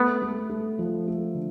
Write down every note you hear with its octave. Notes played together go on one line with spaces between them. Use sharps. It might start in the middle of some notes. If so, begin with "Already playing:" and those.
Already playing: A3 B3
A3
A3
F3
A3
D3